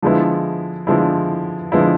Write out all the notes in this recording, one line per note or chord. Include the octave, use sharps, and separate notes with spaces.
D3 F3 G#3 B3 E4
D3 F3 G#3 B3 E4
D3 F3 G#3 B3 E4